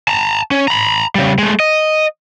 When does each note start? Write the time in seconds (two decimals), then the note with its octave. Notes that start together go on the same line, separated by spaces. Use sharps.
0.08 A5 A#5
0.51 C#4
0.68 A#5 B5
1.15 C#3 G3
1.38 G#3 A3
1.60 D#5